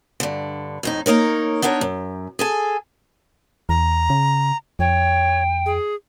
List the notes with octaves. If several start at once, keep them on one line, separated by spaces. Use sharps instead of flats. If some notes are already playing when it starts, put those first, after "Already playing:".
G2 D3
F2 A2 D#4
A#3 D#4 A#4 C#5
B3 D4 D#4 A#4 C#5
F#2
G#4 A4 G#5
E2 A#5
C#3
F2 C#5 G5
G#4